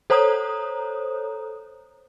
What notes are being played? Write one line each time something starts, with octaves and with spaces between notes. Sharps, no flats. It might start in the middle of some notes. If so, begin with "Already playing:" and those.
A4 C5 C#5 A#5 D#6